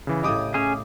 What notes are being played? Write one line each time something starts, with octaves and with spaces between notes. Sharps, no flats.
C#3 E3
A2 C#3 G4 D#5 D6 D#6
C#4 G#4